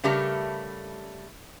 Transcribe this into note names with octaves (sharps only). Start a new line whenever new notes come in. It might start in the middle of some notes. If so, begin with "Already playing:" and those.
C#3 G3 A3 G4 A4 A#4